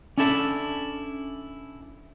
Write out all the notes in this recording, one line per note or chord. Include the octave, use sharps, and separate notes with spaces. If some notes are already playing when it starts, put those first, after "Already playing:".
C#4 D4 E4 A4 E5